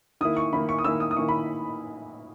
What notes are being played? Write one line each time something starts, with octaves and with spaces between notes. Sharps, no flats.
D#3 A#3 E4 D#6
C#6
D#3 A#3 E4 B5
C#6
D#6
D#3 A#3 E4 E6
D#6
D#6
D#3 A#3 E4 C#6
B5